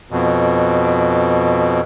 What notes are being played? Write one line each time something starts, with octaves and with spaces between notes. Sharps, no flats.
F2 B2